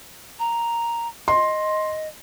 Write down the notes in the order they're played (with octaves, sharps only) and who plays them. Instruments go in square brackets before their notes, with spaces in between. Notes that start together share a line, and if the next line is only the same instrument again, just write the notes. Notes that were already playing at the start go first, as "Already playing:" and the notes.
[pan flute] A#5
[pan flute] D#5 [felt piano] C6